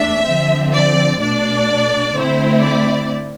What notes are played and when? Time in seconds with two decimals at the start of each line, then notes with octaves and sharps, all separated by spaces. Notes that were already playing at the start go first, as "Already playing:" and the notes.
Already playing: E2 A3 D4 E5
0.25 D3 F3 C4
0.73 D5
1.20 B2 A3 D4 D5
2.14 D3 A3 C4 E4 C5
2.62 D5